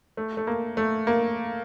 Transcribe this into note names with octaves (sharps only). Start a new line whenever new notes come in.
A3
A3
A#3
A3
A#3